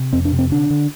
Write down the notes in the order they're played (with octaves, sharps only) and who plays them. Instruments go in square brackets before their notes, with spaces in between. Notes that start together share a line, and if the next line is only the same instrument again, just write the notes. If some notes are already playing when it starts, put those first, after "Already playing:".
Already playing: [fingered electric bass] C3
F2 C4
D4
C3
C4
D3 D4
D3